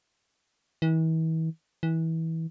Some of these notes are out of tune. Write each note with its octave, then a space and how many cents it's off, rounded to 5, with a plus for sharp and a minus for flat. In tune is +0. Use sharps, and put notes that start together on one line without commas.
E3 -40
E3 -25